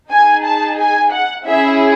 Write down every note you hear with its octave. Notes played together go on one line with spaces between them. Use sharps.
D#4 G#4 G#5
A5
G#5
F#5
C#4 E4 G#4 E5